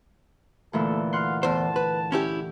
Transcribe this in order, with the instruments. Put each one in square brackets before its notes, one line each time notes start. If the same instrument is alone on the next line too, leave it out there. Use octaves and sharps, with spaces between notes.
[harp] D2 A#2 E3 [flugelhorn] A4
[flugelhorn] F5 [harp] F#5 C6
[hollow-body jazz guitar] E2 C5 [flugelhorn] A5
[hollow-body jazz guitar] B4
C#4 E4 G4